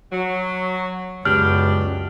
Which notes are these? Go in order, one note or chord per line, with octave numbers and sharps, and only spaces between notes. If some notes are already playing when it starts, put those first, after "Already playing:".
F#3
C#2 F#2 B3 D4 G4 F6